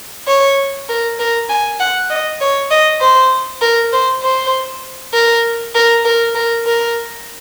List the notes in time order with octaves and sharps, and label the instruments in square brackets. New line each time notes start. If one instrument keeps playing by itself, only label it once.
[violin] C#5
A#4
A#4
G#5
F#5
D#5
C#5
D#5
C5
A#4
C5
C5
A#4
A#4
A#4
A#4
A#4